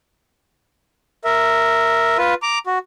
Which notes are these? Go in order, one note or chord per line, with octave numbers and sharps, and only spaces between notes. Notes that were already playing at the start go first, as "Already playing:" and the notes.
A#4 E5
F4 B4
A#5 D6
F#4